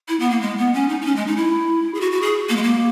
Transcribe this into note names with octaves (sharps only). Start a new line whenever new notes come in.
E4
B3
A#3
G#3
B3
C#4
D#4
D#4
C#4
G#3
D#4
E4
G#4
F#4
F#4
G#4
A#3
G#3
A#3